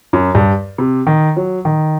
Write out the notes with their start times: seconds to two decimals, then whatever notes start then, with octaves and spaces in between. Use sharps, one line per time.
0.13 F#2
0.35 G2
0.78 C3
1.07 D#3
1.37 F#3
1.65 D#3